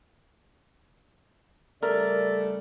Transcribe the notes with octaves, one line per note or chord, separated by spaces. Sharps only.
C#3 G3 A3 A#4 D5